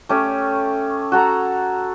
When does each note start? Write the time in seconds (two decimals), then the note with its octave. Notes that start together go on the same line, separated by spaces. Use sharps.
0.09 A3 C#4 G4
1.12 F#4 A4 A#5